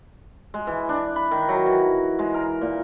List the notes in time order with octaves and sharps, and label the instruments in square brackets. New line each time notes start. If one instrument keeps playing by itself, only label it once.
[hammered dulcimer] G#3
E3
D4
B5
D#3
F#3
E3
G#3
A#4
A#2